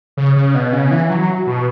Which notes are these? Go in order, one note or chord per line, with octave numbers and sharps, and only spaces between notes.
C#3
C#3
B2
C#3
E3
F#3
B2